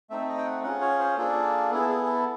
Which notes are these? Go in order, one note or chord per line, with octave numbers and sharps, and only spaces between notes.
A3 C4 D#4 E5
D#5
G5
F#5
C#4 F4 G#4 F#5
C#5
C5
A#3 D4 F4 G#4 A4
B3 E4 G#4 A4
G#4
A4